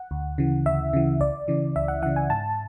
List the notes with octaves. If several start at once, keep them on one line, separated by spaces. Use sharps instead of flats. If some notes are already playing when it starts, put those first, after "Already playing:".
Already playing: F#5
D2
C#3 E3
D2 E5
C#3 E3
C#2 D5
C#3 E3
C#2 E5
F#5
C#3 E3 F#5
G#5
G#2 A5